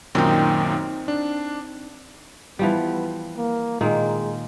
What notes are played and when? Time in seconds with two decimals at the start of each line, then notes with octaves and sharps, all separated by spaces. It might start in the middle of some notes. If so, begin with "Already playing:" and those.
0.15 F#2 A#2 D#3 C4 D#4
1.08 D4
2.59 E3 F3 G3 B3
3.37 A#3
3.81 A#2 D#3 G#3 A#3